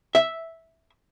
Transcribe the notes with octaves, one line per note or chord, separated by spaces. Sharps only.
E5